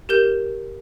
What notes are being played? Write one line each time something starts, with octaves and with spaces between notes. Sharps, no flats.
G4 A#4 G6 E7